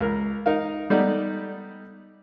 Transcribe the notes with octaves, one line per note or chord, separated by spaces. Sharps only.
C#2 A#4
D#4 A#4 F5
G3 A3 B3 D#4 D5